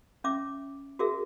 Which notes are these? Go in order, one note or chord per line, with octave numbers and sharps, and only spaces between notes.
C#4 E5 D6
F#4 G#4 A#4 E5